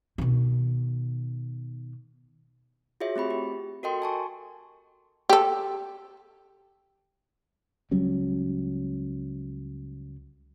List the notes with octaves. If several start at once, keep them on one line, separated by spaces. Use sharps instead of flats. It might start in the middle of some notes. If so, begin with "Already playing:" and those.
B2 D#3
F4 F#4 G#4 C#5 E5
A3 C4 G4 B5
G4
F#4 A4 A#4 D#5 G5 C6
G#5 A5 C#6
G4 A4
C#2 F#3 G3 C#4